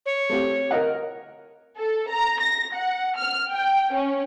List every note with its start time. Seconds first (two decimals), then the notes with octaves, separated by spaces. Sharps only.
0.06 C#5
0.29 A3 C4 G4
0.71 A#4 D#5 F#5
1.78 A4
2.09 A#5
2.41 A#6
2.73 F#5
3.16 F6
3.50 G5
3.93 C#4